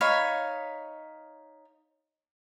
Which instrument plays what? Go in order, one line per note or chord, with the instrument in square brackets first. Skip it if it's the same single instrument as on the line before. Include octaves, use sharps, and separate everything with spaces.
[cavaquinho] D#4 C#5 F5 B5